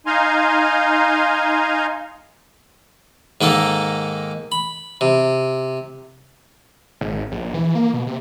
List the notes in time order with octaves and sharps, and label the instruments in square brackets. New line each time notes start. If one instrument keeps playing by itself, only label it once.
[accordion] D#4 F5 G#5 A#5 C6
[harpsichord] G#2 D#3 A#3 A4
B5
C3
[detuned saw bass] G#1
A#1
E3
A#3
B2
C3